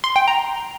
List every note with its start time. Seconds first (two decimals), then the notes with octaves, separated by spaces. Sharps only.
0.04 C6
0.16 G5
0.28 A#5